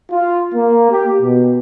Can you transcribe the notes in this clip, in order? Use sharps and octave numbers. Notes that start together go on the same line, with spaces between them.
F4
A#3
G4
B2